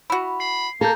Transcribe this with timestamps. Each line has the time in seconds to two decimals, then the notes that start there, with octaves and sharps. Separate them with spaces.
0.10 E4 F#4 B5
0.40 B5 C7
0.81 A#3 A4 A#5 G6